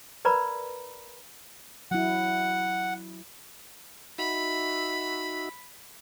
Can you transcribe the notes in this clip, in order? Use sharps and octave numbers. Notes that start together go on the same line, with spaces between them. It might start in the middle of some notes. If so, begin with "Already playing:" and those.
A#4 B4 D5 A#5 B5
F#3 E4 F#5
D#4 F#4 E5 B5